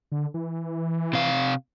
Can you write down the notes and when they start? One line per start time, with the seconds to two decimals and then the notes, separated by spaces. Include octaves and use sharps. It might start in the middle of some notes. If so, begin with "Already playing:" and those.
0.12 D3
0.34 E3
1.13 C3 F5